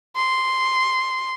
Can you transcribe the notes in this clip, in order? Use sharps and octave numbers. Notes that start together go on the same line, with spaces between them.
C6